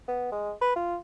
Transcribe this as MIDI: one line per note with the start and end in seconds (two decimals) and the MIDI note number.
0.08 0.27 59
0.32 0.52 56
0.62 0.73 71
0.76 0.96 65